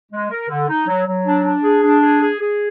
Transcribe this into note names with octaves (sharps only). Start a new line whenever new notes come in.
G#3
A#4
D3
D#4
F#3
F#3
D4
D4
G#4
D4
G#4
G#4
G#4